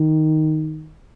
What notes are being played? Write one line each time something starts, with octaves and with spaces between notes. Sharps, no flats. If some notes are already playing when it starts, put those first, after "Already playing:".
Already playing: D#3